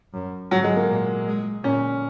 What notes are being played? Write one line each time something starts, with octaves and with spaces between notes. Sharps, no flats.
F#2
G#2 F#3
G#3
A#3
A#2
G#3
A#2 C#4